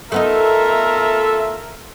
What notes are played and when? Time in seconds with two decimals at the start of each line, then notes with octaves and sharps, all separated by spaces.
0.12 A3 B3 D#4 F4 A4 A#4 E5